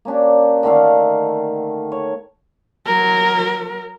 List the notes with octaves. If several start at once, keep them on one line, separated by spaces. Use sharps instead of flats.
A#3 C#4 D4 G4
D3 D#3 A3 F5
C#5
F#3 A#4